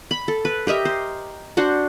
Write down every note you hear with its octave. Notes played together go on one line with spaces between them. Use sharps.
B5
A4
B4
G4 A#4 D#5 E5
C5
D4 F#4 C5